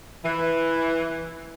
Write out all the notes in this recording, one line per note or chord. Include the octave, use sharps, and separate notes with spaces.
E3